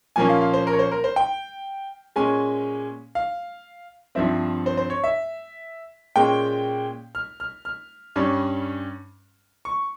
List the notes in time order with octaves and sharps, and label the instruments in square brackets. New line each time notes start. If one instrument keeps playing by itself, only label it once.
[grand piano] A#2 F3 A#3 C#4 G#5
F5
F5
C5
A#4
C#5
C5
A#4
C5
G5
A#2 G#3 C#4 G#5
F5
G2 F3 C4 E5
C5
C5
C#5
E5
A#2 G#3 C#4 G5
F6
F6
F6
G2 G3 C#4
C#6